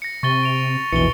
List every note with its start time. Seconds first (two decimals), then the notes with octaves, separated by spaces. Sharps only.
0.02 A#6 C#7
0.23 C3 C#6 A6 G7
0.43 D7 F7
0.92 A#1 E2 B2 E3 C#7 G7